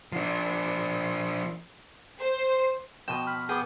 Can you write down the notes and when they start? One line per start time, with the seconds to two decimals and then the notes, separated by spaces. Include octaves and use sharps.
0.12 F3 D4
2.18 C5
3.08 B2 F3 G5 D#7 E7
3.27 B5 F6
3.49 B3 G#4 G5 D6